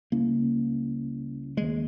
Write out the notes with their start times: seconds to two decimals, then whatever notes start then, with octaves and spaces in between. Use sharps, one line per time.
0.12 C#2 C#3 G3 A#3 C#4 E4
1.57 D#2 D#3 G#3 A#3